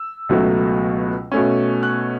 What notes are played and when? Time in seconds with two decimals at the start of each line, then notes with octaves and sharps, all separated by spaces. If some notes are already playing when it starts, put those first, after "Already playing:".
Already playing: E6
0.29 C#2 B2 F#3 A3
1.32 B2 A3 C#4
1.83 F#6